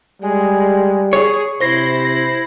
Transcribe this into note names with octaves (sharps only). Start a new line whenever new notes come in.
G3 G#3
G#4 C#5
C3 E4 C5 A#6 C7